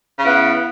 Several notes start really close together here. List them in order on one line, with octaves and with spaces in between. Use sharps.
C#3 E4 B3